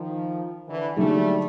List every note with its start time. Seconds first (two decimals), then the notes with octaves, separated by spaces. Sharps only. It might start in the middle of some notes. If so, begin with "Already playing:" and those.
Already playing: D#3 F3
0.69 D3 E3
0.96 D3 F#3 G3 A3 A#3 D#4 G#4